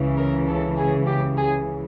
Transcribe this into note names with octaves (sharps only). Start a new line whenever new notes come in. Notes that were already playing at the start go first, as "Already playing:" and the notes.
Already playing: C#2 C#3 E3
A#4
A4
G#4
G4
G#4